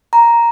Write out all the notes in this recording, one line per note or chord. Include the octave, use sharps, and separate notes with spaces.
A#5